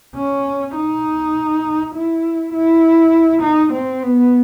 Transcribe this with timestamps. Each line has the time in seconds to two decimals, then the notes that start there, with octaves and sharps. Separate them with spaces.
0.15 C#4
0.75 D#4
1.94 E4
2.53 E4
3.42 D#4
3.73 C4
4.03 B3